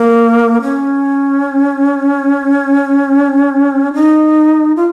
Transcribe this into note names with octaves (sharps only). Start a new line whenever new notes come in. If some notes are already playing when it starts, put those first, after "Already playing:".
Already playing: A#3
C#4
D#4
F4